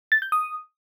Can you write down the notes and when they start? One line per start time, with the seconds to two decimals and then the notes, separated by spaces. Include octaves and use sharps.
0.12 A6
0.22 G6
0.32 D#6